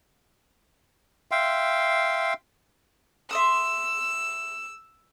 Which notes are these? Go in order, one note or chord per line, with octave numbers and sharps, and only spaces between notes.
E5 F5 G5 C6
E5 C6 D#6 E6